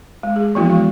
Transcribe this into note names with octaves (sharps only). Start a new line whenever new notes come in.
G#3
G#4
E3 F3 A#3 B3 E4 F#4
G#3